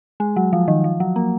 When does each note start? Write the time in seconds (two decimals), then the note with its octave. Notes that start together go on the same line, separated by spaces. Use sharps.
0.20 G#3
0.36 F#3
0.53 F3
0.68 D#3
0.84 F3
1.00 F#3
1.16 A#3